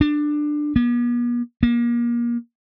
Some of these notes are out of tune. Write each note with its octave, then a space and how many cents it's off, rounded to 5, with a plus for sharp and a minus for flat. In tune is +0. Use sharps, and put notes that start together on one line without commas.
D4 +15
B3 -45
A#3 +30